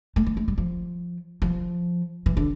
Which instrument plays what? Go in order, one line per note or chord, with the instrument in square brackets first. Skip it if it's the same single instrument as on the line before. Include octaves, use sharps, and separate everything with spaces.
[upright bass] A3
A3
A3
G3
F3
F3
E3
D3